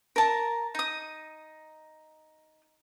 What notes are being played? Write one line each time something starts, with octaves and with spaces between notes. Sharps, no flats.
A#4 A5 A#5
D#4 D#6